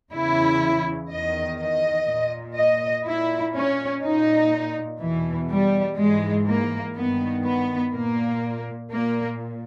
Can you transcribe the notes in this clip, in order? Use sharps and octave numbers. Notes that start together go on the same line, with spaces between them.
E2 C#3 E3 E4
E2 D#3 D#5
D#5
A#2
D#5
A#2 E4
C#4
A#2 D#4
E2 B2 E3
G3
G#2 E3 G#3
A#3
G2 D#3 B3
B3
A#2 A#3
A#2 A#3